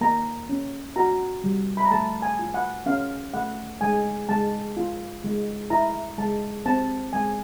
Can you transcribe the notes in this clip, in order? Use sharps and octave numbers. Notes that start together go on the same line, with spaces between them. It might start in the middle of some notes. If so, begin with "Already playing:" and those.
A#3 A#5
C#4
F#4 A#5
G3
B5
A#5
A3 A5
G#5
F4
F#5
C#4 F5
A3 F#5
G#3 G#5
G#3 A5
F4
G#3
E4 A#5
G#3 A5
C4 A5
G#3 G#5